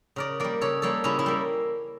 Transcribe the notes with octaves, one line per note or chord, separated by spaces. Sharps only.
C#3 A#4 D5
G3 A#3 A#4 D5
C#3 A4 C#5
G3 A#3 A4 C#5
C#3 C#4 E4
C#4 E4
G3 A#3